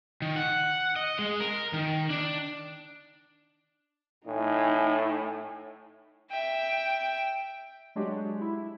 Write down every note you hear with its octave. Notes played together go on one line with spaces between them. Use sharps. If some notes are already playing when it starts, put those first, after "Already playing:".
D#3
F#5
D#5
G#3
A#4
D#3
D4
A2 D#4 G#5
E5 G5
F#3 G#3 D4 F#4 G4
E4